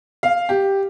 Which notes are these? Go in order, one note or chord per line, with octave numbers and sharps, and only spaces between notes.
F5
G4